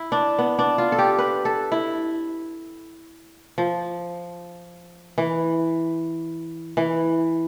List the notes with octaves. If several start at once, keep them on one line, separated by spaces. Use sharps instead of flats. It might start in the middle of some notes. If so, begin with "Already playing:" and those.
Already playing: E4
D4
B3
D4
F4
A4
G4
B4
A4
E4
F3
E3
E3